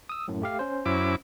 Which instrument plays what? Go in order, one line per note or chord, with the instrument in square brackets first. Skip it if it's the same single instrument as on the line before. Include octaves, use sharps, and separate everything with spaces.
[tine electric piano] D#6 E6
F#2 A2
A3 G4 F5
C#4 C5
[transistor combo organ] F#2 E4 D6